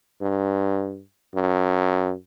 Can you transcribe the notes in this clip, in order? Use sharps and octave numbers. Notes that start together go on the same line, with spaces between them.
G2
F#2